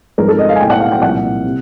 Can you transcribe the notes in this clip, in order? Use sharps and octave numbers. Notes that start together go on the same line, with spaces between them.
G#1 G#2 F3 A#4
A4
D#5
F5
G#5
B1 A2 F#3 A3 G5
F#5
F5
G5
C2 A#2 F3 A#3 F#5
C3